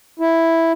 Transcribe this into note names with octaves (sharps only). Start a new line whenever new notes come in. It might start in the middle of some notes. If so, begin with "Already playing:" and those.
E4